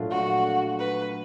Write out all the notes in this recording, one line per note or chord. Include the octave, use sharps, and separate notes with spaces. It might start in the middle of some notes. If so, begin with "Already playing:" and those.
Already playing: A#2 F#3 A3 D4 F4
F#4
B4